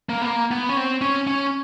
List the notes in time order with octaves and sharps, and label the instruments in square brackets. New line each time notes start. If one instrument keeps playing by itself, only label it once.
[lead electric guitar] A#3
B3
A#3
B3
C#4
C4
C#4
C#4